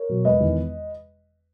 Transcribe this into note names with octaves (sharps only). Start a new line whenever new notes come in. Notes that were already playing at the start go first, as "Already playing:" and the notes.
Already playing: A#4 C#5
B2 F#3
E1 B4 D#5
E2 D#3